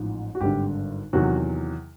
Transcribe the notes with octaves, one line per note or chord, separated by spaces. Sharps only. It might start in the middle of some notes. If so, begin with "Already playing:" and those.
Already playing: A1 G#2 F3
F#4
G#1 G2 D3 G4
E2 C3 D#3 F#3 F#4